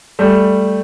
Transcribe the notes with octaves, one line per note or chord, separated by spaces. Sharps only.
G3 A3